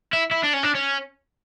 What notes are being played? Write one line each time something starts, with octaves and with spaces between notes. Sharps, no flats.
E4
E4
D4
C#4
D4
C#4